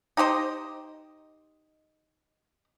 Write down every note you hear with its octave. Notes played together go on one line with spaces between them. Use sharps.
D#4 G4 C5 D#5